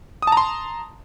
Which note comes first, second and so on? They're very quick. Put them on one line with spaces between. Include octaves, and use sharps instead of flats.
D#6 A5 A#5 C6